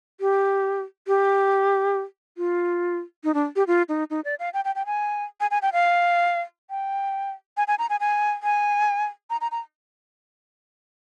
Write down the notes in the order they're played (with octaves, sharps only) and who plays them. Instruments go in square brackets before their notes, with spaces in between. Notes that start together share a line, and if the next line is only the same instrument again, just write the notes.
[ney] G4
G4
F4
D#4
D4
G4
F4
D#4
D#4
D5
F5
G5
G5
G5
G#5
G#5
G#5
G5
F5
G5
G#5
G#5
A#5
G#5
G#5
G#5
A#5
A#5
A#5